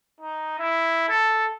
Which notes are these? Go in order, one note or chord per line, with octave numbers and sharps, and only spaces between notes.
D#4
E4
A4